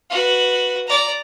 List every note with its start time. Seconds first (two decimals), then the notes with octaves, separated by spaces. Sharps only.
0.10 F#4 B4
0.87 D5 A#5